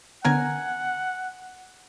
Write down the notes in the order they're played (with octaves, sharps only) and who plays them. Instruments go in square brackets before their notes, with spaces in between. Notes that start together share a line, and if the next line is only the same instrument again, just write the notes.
[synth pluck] D3 B3 C#4 [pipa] A#4 G#5 [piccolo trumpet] F#5